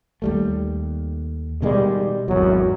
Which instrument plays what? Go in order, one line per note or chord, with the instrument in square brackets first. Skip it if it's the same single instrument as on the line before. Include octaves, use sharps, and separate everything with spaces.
[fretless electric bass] D#2 G3 A3
[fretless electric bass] B2 D#3 G#3 [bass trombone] G3
[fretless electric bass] G#1 E2 [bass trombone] F#3